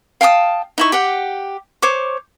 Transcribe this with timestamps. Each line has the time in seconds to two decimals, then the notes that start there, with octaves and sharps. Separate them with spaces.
0.21 F5 G5 A5 D#6
0.78 D#4 E4 C#6
0.92 G4 F#5 G5
1.82 C5 C#5 C#6 D6